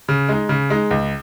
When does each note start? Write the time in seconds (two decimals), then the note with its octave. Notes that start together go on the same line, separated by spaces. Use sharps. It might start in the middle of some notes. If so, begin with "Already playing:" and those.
0.08 C#3
0.29 G#3 D#4
0.49 C#3
0.70 G#3 D#4
0.91 C#2